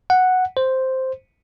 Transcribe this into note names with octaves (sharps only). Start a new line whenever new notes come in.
F#5
C5